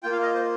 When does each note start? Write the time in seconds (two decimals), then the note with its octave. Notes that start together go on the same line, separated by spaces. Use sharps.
0.03 A#3 F4 G5
0.12 F5
0.23 D#5
0.34 C5